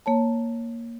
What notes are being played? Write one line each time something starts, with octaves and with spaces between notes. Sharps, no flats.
A#3 C#5 A5